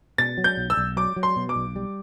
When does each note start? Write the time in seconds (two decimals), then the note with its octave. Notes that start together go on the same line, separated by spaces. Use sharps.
0.18 B2 A6
0.38 F#3
0.44 G6
0.57 B1
0.70 E6
0.77 B1
0.97 F#3 D6
1.16 F#3
1.23 C6
1.36 B2
1.49 D6
1.56 B1
1.76 G3